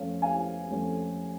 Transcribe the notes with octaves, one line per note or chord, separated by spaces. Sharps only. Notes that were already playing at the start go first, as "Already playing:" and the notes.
Already playing: F2 F3 A3 C#4 F5
F5 G#5
F2 F3 A3 C#4